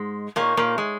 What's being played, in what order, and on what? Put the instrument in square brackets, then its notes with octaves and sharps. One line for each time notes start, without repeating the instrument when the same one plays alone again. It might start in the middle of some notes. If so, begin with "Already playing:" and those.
Already playing: [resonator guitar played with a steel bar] G#2 G#3
[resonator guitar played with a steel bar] A#2 A#3 [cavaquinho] D#4 G#4 C#5
[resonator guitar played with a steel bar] A#2 A#3
G#3